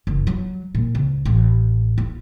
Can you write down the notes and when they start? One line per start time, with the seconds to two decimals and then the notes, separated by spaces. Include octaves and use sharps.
0.07 F#1
0.27 F#3
0.75 A#2
0.95 C#2
1.25 A1
1.98 F4